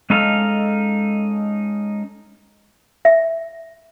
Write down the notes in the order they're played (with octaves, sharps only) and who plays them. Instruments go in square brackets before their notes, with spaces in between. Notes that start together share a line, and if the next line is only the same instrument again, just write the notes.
[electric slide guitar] G#3 C#4 D#4 A4 F5
[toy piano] E5